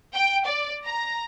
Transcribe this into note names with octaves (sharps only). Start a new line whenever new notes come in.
G5
D5
A#5